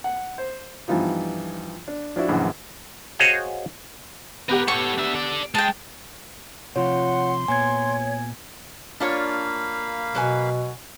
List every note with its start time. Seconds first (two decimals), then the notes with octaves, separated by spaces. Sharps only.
0.04 F#5
0.38 C5
0.88 G2 E3 F3 B3 D#4 F4
1.88 D4
2.16 F3 D4 E4 F#4
2.28 A#1 F#2 D3 E3 F#5
3.19 F#4 G#4 C5 C#5 D#5 F5
4.49 B3 G4 A#4 B4 F#5
4.68 A4 C#5 C#6
4.98 D4 E5
5.14 A4 D5
5.55 G#3 G5 A5
6.76 C3 F3 F4 C#5 F#5 C6
7.48 A#2 B3 C#5 G#5 G#6
9.00 A#3 D4 F4 C#5 F5 B5
10.15 B2 F#3 B4 G#5